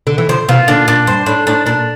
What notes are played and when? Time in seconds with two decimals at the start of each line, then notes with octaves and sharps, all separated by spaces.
0.07 D3
0.18 E3
0.29 D3 F3 C5
0.48 C3 E3 F4
0.68 A#2 D3 D4
0.88 A#2 D4
1.07 G2 C5
1.26 A2 D4
1.47 A2 D4
1.66 A#2 D4